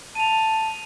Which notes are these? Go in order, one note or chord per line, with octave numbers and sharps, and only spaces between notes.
A5 D#7 F7